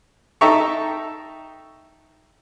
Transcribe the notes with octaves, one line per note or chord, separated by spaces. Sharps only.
D#4 A4 E5 G5 A#5 C#6